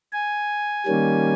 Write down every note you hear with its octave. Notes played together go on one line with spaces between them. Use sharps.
G#5
D#3 G3 A#3 C#4